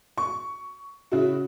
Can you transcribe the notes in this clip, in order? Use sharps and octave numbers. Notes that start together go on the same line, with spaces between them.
C#6
C#3 E4 F#4